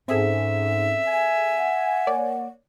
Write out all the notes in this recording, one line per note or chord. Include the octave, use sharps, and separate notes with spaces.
G#2 C4 C#4 G#4 A4 E5
G#5
F#5
A#3 C#5 D5